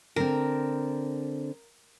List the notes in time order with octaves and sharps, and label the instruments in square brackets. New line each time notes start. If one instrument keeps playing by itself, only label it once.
[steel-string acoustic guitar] D3 C4 [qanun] A#4